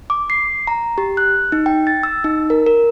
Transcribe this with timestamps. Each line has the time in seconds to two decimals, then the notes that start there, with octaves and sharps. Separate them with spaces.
0.10 D6
0.30 C7
0.67 A#5
0.98 G4
1.17 F#6
1.52 D#4
1.66 G5
1.87 A6
2.03 E6
2.24 D#4
2.50 A#4
2.66 A#4